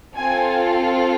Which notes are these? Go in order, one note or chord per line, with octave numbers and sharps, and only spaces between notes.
C4 F4 A4 G#5